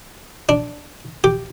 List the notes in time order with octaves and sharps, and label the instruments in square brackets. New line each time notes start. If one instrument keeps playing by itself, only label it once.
[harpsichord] D4
G4